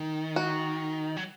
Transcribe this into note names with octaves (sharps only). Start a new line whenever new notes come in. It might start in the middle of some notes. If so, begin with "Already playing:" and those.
Already playing: D#3
F#4
F#3